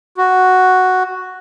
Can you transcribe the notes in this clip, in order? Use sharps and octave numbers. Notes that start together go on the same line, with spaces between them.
F#4